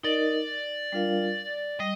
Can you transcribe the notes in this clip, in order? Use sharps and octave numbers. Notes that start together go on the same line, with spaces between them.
D#4 A#4 D5 D#5
G3 D4 F4 A#4 F5
G3 D#5